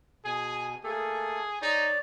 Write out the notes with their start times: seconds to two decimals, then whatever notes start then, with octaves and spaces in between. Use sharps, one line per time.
0.25 B2 G#4 G#5
0.84 A3 A#3 G#4 A4
1.62 D#4 C#5 D5